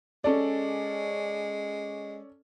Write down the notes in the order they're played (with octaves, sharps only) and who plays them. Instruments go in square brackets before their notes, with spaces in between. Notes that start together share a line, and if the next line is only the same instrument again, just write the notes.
[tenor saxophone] G#3 [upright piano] C#4 A4 D5